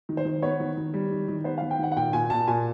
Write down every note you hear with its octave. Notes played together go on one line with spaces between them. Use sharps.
D#3
C5
D#3
B3 C#5
D#3
D#3
G3
D#3
D#3
B3 C5
D#3 F5
G5
D#3 F#5
F#5
A#2 G5
A#2 G#5
A#2 A5
A#2 G#5